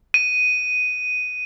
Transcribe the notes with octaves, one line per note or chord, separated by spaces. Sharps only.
D#7